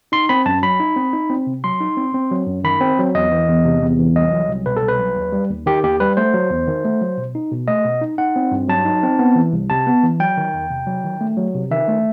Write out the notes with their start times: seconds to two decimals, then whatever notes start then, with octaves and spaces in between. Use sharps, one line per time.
0.12 D#4 C6
0.29 C4 B5
0.46 F#2 A5
0.62 F#3 B5
0.80 D#4
0.96 C4
1.13 D#4
1.30 C4
1.47 C3
1.64 F#3 C6
1.80 D#4
1.97 C4
2.14 C4
2.31 F#3
2.47 F#2
2.64 D#3 B5
2.81 C4
2.98 F#3
3.15 E2 D#5
3.32 E3
3.48 E2
3.65 C3
3.82 E2
3.99 E3
4.15 C2 D#5
4.32 F#3
4.48 C2
4.66 B2 B4
4.77 A4
4.82 C2
4.88 B4
4.99 F#3
5.16 D#2
5.32 G3
5.50 D#2
5.66 D#3 G4
5.84 D#2 G4
6.00 G3 B4
6.17 A3 C5
6.33 F#3
6.50 E2
6.68 D#3
6.85 A3
7.01 F#3
7.17 B2
7.35 D#4
7.51 B2
7.68 A3 D#5
7.84 B2
8.01 D#4
8.18 D#4 F#5
8.36 C4
8.52 G2
8.68 F#3 A5
8.85 D#4
9.03 C4
9.19 B3
9.35 E3
9.53 C2
9.70 C3 A5
9.87 B3
10.03 E3
10.20 F#3 G5
10.37 D#3
10.54 E2
10.70 C3
10.87 F#3
11.04 D#3
11.21 A3
11.37 F#3
11.54 C3
11.71 D#3 E5
11.88 A3